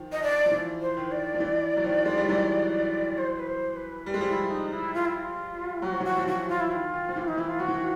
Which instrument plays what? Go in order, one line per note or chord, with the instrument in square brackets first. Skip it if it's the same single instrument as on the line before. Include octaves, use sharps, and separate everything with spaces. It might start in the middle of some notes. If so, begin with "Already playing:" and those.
Already playing: [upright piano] D#3 F3
[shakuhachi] D#5
D5
[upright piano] F3
E3
[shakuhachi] C5
[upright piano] D#3
[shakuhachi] D5
[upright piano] F3
E3
F#3
D#3 F3
G#3
G3
E3 F#3
[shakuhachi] C5
B4
C5
B4
[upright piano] G3
G#3
F3 G3
[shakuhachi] E4
D#4
E4
F4
E4
F4
[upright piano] F#3 [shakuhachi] F#4
[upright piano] F3
[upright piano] E3 F#3 [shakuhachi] F#4
[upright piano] F3
[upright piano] E3 [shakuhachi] F#4
[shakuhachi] F4
E4
[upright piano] D#3 [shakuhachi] F4
[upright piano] D#3
F3
E3
[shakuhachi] D#4
[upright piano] E3 [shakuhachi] E4
[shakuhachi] F4
[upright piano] F3 [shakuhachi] F#4
[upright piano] E3
D#3